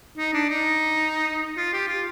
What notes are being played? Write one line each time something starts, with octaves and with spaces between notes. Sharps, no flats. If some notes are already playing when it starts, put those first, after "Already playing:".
D#4
D4
D#4
F4
G4
F4